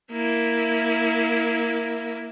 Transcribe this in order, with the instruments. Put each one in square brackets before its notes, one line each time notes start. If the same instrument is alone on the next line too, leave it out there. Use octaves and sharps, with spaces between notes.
[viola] A#3 E4